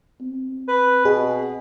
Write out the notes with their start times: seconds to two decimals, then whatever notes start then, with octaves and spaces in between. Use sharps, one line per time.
0.21 C4
0.68 B4
1.05 B2 G#4